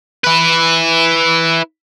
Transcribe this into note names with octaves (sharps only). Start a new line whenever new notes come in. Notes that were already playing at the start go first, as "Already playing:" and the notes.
E4 B4